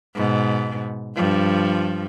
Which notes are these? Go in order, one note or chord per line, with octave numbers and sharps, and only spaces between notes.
G#2 B2
G2 F3